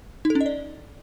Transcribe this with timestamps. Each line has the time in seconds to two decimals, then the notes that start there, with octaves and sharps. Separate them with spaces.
0.25 D#4
0.30 A4
0.35 C#4
0.41 D#5
0.46 D5